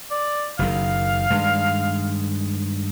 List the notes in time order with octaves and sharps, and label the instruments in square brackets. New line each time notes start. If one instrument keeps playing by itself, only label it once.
[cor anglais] D5
[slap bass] F#1 D#3 [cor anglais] F5
[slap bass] G2 D#3 G#3